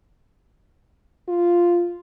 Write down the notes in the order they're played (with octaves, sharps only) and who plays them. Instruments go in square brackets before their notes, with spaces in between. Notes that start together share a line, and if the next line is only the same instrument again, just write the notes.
[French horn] F4